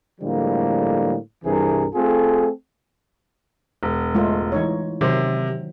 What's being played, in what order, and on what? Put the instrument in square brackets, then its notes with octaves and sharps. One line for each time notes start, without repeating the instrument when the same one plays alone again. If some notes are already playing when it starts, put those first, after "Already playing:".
[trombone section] A2 D3 F3 G3 G#3 A#3
C2 G2 C3 E3 G#4 A#4
A3 C4 F4 G#4 A4
[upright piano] E1
[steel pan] G#3 A3 F4
E3 D#4 C#5
[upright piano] C3 [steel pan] D#3 F#3 C5